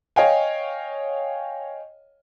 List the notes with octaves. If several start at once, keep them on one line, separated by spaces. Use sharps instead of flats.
C#5 D#5 F5 G5 G#5